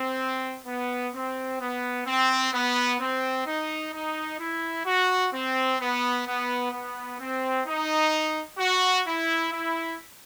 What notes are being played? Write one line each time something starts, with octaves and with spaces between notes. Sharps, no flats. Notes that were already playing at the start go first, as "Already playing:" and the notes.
Already playing: C4
B3
C4
B3
C4
B3
C4
D#4
D#4
E4
F#4
C4
B3
B3
B3
C4
D#4
F#4
E4
E4